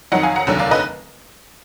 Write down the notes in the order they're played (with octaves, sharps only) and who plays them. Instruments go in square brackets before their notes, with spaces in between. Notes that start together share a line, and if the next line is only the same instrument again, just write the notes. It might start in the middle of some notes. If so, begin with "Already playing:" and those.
[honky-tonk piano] F2 D#3 F#3 D#5 F#5
F5 G#5
F#5 A#5
F1 D#2 D3 F#3
D5 F5
B4 D#5